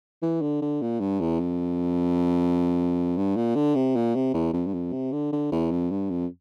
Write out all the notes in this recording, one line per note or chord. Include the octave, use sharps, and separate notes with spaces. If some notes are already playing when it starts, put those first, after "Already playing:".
E3
D3
D3
A#2
G2
E2
F2
G2
A#2
D3
C3
A#2
C3
E2
F2
G2
F2
C3
D3
D3
E2
F2
G2
F2